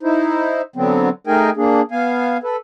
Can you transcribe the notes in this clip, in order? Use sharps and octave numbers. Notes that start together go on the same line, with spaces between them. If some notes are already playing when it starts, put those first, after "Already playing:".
D#4 E4 C5
D3 F#3 B3 C4
A3 D#4 G#4 A#4 G5 G#5
A#3 D4 G#4
B3 F5 G#5
A4 B4